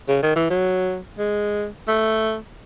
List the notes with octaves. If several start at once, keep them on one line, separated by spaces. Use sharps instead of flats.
C#3
D#3
E3
F#3
G#3
A3